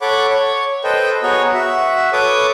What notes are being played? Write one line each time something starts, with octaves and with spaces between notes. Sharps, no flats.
A4 C#5 F#5 B5 D6
C#5
A4 B4 C5 D#5 G5
B3 F#4 G#4 C#5 A#5
F#4 E5
A4 B4 C#5 D6 D#6